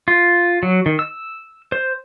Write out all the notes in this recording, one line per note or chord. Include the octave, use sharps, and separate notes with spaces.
F4
F#3
D#3
E6
C5